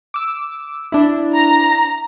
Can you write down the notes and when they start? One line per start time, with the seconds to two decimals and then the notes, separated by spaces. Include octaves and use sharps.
0.14 D6 E6
0.92 D4 E4
1.35 A#5